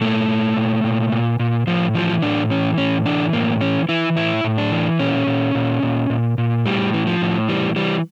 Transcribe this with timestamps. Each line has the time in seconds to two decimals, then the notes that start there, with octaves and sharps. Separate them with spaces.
0.01 A#2 A3
0.28 A#2
0.57 A#2
0.84 A#2
1.12 A#2
1.40 A#2
1.67 A2 F3
1.94 E3 F3
2.22 A2 D4
2.50 E3 C#4
2.78 A2 C#4
3.06 E3 D4
3.33 A2 A#3
3.61 E3 C#4
3.89 E3 E4
4.16 A2 E4
4.44 A2
4.58 D4
4.72 E3
4.99 A#2 C#4
5.27 A#2
5.55 A#2
5.83 A#2
6.10 A#2
6.38 A#2
6.65 A2 G3
6.94 E3
7.07 F3
7.21 A2
7.48 E3 G3
7.76 E3 G3